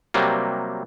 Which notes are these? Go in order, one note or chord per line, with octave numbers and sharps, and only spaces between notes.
C3 F#3 G3 A#3